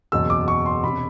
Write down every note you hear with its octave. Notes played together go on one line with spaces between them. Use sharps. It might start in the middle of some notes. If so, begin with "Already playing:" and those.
F#1 E2 B2 E6
D6
C#6
C6
E1 C3 B5